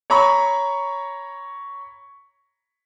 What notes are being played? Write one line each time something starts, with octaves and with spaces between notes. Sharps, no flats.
C#5 A#5 B5 C#6